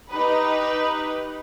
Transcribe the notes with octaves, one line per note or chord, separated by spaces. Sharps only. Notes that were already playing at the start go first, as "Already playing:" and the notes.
D#4 G4 B4